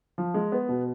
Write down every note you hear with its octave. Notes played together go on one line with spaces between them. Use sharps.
F3
G#3
B3
B2